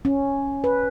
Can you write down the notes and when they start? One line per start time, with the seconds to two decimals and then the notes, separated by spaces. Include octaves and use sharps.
0.05 C#4
0.64 B4